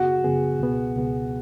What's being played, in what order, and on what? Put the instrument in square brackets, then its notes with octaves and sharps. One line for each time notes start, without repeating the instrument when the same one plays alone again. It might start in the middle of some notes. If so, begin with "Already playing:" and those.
Already playing: [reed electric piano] F#2 C#3 B3 G#4 [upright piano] F#4
[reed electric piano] F#2 C#3 B3 G#4
C#2 B2 B3 G#4
C#2 B2 B3 G#4